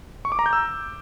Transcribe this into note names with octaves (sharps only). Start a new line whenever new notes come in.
C#6
D6
A#5
G6
E6